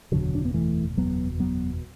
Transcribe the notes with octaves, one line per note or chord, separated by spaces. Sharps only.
F#1 E2 B2 D3 F#3
D4
B3
E3 A3
F#1 E2 B2 F#3 B3
F#3 B3